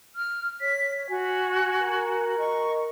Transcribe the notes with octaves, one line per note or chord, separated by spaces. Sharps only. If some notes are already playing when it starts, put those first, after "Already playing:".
F6
C#5 B6
F#4 G#5
A#4
D#5 C#6